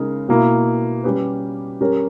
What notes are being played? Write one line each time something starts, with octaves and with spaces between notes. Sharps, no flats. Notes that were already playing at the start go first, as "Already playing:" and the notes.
Already playing: C#3 G#3 D#4 A#4
B2 A#3 E4
G3 C#4 G4 B4
G3 C#4 G4 A#4 C#5